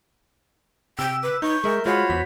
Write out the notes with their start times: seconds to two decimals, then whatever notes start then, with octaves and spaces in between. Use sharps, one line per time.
0.99 C3 G5 E6
1.23 B4 D6
1.42 D#4 B4 C#6 G6
1.64 G#3 A#4 E5
1.86 G#3 F4 F#4 C5 C#5 B5
2.10 E2 B6